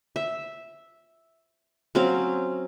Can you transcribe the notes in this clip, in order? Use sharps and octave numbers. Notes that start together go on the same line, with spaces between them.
E5
F#3 C4 C#4 F5